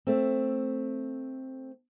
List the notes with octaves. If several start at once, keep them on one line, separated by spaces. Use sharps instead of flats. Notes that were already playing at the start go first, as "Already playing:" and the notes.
A3 C4